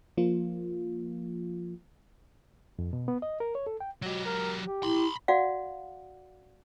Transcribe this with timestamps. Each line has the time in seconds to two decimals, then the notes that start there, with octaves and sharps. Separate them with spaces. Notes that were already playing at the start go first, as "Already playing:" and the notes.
0.17 F3 A#3 F4
2.79 F2
2.93 B2
3.08 B3
3.22 D#5
3.40 A#4
3.55 C#5
3.67 A4
3.80 G5
4.02 B2 F#3 G4
4.26 A#4
4.65 G4
4.83 E4 B5 C6
5.28 F#4 D5 F5 F#5